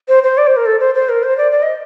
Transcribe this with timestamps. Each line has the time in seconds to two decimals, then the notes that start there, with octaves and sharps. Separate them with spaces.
0.08 C5
0.23 C5
0.38 D5
0.47 C5
0.57 A#4
0.66 A4
0.80 C5
0.95 C5
1.09 A#4
1.23 C5
1.38 D5
1.52 D5
1.62 D#5